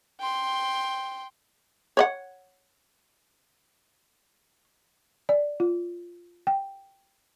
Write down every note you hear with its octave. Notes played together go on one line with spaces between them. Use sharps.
G5 C6
C#5 D5 F#5
D5
F4
G5